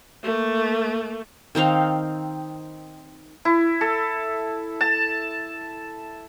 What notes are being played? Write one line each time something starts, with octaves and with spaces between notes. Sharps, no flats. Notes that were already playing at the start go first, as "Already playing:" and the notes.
A3 A#3
D#3 C4 D#4 F5
E4
A4
A5